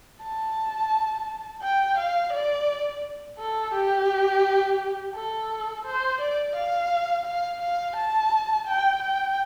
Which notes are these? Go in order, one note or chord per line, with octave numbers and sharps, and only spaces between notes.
A5
G5
F5
D5
A4
G4
A4
C5
D5
F5
F5
F5
A5
G5
G5